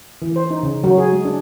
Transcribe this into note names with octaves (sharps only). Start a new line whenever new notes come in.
E3
C5
D#4
C#3
F#3
G#4
G#3
D4